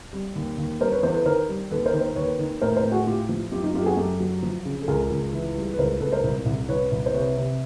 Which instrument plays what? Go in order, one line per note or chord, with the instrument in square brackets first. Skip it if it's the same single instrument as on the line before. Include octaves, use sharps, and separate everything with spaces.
[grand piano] G3
D#2
D#2
G3 A#4 C5
B4 C#5
E2 A#4 C5
A4 B4
D#3 A#4 C5
G3
D#2 A4 B4
A#4 C5
D#3
A#4 C5
D#2 B4 C#5
D#3
A2 A#4 C5
A#4 C5
A2
F#4 G#4
A2 F4 G4
F3
F#2 F4 G4
D#4 F4
F#2 F4 G4
A4
F#4 G#4
F#2 G4 A4
F#3
F3
C#3
A4
C#2 G#4 A#4
C#2
E3
G3
B4
C#2 A#4 C5
C#2 A4 B4
A#4 C5
C2
C2
C2 B4 C#5
C2
C5
C3 B4 C#5
C3